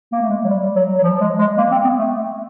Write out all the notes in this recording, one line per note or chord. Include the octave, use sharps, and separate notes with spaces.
A#3
A3
G#3
F#3
G3
F#3
F#3
F3
G#3
G#3
A#3
C4
B3
A3